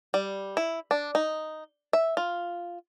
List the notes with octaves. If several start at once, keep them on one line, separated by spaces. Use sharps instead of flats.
G3
E4
D4
D#4
E5
F4